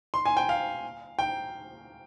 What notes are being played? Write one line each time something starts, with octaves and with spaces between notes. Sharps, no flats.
C6
G#5
G5
F5
G5